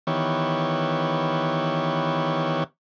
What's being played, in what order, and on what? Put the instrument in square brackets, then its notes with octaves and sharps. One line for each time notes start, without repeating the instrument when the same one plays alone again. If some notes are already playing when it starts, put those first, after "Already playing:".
[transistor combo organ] D#3 E3 B3 G4 C#5